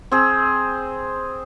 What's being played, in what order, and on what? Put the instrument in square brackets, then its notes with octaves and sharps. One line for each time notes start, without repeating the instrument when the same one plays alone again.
[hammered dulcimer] C4 G#4